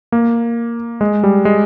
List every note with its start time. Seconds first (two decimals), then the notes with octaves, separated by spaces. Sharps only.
0.12 A#3
1.01 G#3
1.24 G3
1.45 G#3